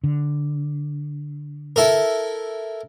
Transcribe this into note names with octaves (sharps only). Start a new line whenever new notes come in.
D3
E4 A4 A#4